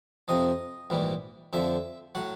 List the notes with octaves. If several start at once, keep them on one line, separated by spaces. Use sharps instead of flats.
F2 C3 F3 D#5
A#1 G#2 E3 G3
F2 D3 F3 E5
A2 F#3 F#5